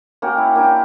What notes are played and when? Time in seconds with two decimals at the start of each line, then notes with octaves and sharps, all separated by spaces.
0.22 A#3 C#4 F#4 G4
0.38 E4
0.55 A#3 D4 G4